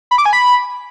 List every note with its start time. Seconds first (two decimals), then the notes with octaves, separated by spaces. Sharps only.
0.11 B5
0.18 D6
0.26 G#5
0.33 B5